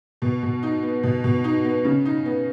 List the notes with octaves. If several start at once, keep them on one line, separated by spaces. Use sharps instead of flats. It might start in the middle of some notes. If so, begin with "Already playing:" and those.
B2
B2
D#4
B3
B2
B2
D#4
B3
C#3
D#4
B3